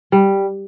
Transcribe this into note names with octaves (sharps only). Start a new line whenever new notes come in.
G3